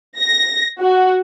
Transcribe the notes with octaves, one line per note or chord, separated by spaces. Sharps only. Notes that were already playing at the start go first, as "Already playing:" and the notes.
A#6
F#4